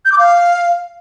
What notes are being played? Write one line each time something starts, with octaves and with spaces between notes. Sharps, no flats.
G6
D6
F5